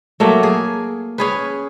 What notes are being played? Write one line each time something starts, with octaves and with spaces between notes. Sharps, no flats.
F#3 A3 A#3
G#4
C#4 G#4 B4